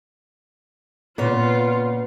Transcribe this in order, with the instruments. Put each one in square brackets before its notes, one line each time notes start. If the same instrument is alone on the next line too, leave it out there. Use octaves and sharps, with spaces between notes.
[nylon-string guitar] A#2 C#3 [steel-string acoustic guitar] B3 C#5 [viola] F4